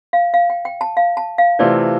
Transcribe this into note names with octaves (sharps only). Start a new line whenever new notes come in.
F5
F5
G5
G5
A5
F5
A5
F5
C3 E3 A3 C4 F4 D5